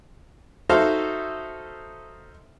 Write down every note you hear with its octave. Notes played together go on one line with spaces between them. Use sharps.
D#4 F#4 A4 C5 E5 F5